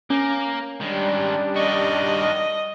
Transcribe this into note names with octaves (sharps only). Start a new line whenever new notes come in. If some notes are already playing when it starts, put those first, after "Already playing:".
A#3 C#4
D#3 G3 G#3 D4
D#3 F#4 D#5